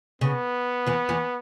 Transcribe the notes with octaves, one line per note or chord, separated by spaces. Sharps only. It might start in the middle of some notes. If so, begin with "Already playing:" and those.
C#3 B3
E2 E3
E2 E3